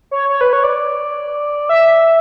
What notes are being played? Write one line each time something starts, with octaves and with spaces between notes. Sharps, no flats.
C#5
C#5
B4
C#5
D5
E5